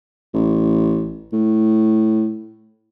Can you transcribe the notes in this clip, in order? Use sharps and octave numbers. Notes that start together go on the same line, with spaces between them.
A1
A2